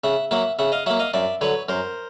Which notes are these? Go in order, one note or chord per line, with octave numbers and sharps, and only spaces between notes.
C#3 E5 F#5
F#3 A#3 E5 F#5
C#3 E5 F#5
D#5 F5
F#3 A#3 E5 F#5
D#5 F5
F#2 D5 E5
D3 F#3 B4 C#5
F#2 A#4 C5